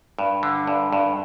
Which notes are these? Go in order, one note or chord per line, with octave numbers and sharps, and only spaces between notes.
G2
D3
G2
G2